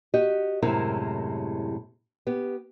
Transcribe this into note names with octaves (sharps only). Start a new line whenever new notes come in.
F#4 G4 D#5
F#2 A2 C3 G#3 E4 A#4
B3 G4